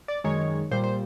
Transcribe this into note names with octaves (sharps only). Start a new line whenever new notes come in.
D5
F#2 D#3 G#3 C#5
A#2 G3 C5
C5